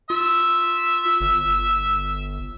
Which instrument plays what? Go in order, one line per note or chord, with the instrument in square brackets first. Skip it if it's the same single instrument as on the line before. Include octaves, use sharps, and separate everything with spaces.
[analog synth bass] F4 [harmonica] E5
[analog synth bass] G1